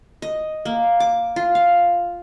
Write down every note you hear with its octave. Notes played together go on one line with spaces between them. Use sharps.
D#5
A#3
D6
F4
F5